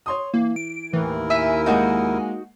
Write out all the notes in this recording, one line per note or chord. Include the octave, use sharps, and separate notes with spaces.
C#5 C6 D#6
E3 A#3
D7
D#2 A2 E3 E4 A#4
E5 G#5
G#3 A#3 D#4 F#4 D#5